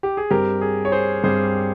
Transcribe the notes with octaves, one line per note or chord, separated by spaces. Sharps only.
G4
G#4
G2 G3 C4 G4 A#4
G#4
C#5
G#4 C5
G2 G3 C4 G#4 C5